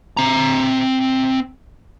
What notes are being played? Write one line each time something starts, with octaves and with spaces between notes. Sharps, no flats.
C4 A#5